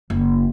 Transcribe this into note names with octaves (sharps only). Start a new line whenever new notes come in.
F#1